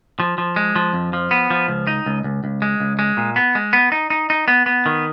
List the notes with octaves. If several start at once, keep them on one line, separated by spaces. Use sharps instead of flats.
F3
F3
G#3
F3
F2
F3
B3
F3
C#2
D#4
C#2
C#2
C#2
G#3
C#2
G#3
A#2
B3
G#3
B3
D#4
D#4
D#4
B3
B3
D#3